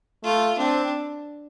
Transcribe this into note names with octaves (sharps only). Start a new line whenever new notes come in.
A3 F4
C4 D4